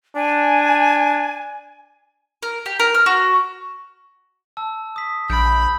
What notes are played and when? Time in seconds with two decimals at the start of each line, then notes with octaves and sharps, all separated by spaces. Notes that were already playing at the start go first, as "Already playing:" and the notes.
0.16 D4 G#5
2.43 A#4
2.66 G4
2.80 A#4
2.94 F6
3.06 F#4
4.57 A5 E6
4.96 D#6 B6
5.30 A#1 B5 G6 D7